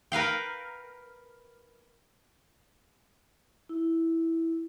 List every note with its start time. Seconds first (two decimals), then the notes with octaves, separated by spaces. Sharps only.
0.12 A#4 B4 F5 G5
3.69 E4